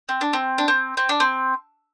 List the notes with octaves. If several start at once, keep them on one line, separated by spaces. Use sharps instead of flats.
C4
D4
C4
D4
C4
C4
D4
C4